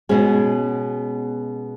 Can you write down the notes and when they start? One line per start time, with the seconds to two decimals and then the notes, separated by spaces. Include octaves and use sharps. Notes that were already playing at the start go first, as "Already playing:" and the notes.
0.09 B2 G#3 C#4 G#4